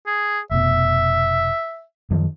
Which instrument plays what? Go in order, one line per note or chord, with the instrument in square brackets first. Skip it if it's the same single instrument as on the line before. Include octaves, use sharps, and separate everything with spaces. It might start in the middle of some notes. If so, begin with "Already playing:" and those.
[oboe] G#4
[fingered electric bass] F1 B2 [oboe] E5
[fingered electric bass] F#2 D#3 F3